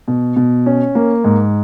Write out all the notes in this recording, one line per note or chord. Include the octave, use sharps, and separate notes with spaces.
B2
B2
C#4
A#3
G#2